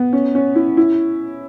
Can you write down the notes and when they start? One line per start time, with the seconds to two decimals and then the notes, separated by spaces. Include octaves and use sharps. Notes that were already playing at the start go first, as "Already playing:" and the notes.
Already playing: B3
0.13 C#4
0.35 C#4
0.55 E4
0.77 E4